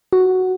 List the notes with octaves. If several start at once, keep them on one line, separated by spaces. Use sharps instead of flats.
F#4